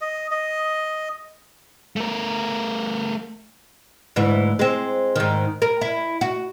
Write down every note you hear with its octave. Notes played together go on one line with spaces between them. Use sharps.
D#5
D#5
A3 A#4
D2 G#2 E3
G#3 C4
G#2 D#3
A#4
E4
F#4